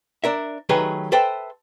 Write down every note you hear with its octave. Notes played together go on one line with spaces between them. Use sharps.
D4 A#4 E5
D#3 F#3 A3 G4 G#4 B4
A4 B4 C5 E5 G5 A5